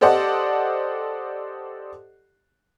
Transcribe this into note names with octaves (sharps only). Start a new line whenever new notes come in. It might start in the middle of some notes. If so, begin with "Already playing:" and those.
G4 A4 C5 D5 D#5 F#5